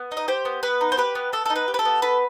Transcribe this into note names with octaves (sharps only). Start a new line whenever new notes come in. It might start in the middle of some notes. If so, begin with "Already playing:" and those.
Already playing: B3
D#4
D#5
G4 C5
B3
B3 B4
D#4
C5
G4 B4
B3
B3 A4
D#4 A4
B4
G4
B4
A4
B3
A4 B4